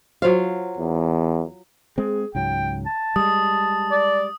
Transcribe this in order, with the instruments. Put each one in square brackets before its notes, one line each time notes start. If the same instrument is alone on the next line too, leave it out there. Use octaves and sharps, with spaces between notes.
[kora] F#3 F4 F5 [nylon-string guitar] C5
[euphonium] E2
[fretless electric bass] G#3 C4 [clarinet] G#4
[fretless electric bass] C#2 G#2 F#3 [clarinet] G5
[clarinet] A5
[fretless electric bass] G3 G#3 [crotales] D#6
[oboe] D5